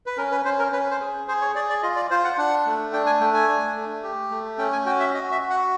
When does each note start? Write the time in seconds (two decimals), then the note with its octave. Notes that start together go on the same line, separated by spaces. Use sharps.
0.06 B4
0.17 C#4 A#4
0.32 B4
0.45 C#4 C5
0.59 A#4
0.72 C#4 B4
0.91 C5
1.01 G#4
1.28 G#4 C5
1.41 C#5
1.55 G#4 D5
1.69 D5
1.83 F4 D#5
1.96 D5
2.10 F4 C5
2.25 F#5
2.38 D4 F#5
2.66 A3
2.93 D4 G5
3.06 G#5
3.21 A3 G5
3.34 G#5
3.48 D4
3.76 A3
4.03 G4
4.31 A3
4.58 C#4 G5
4.73 G#5
4.86 F#4 G5
5.00 E5
5.14 F#4 D#5
5.32 E5
5.41 F#4
5.50 F#5